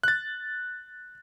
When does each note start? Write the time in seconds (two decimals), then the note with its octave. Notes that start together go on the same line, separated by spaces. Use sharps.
0.03 F#6 A6